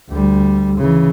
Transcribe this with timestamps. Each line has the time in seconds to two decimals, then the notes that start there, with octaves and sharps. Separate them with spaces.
0.10 D2 G3
0.78 C#3 E3